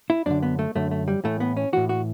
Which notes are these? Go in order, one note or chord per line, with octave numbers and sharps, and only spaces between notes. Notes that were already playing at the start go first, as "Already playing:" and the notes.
E4
F#2 D3 D4
B3
A3
F#2 D3 A3
A3
G3
A2 E3 A3
B3
C#4
A2 E3 F#4
F#4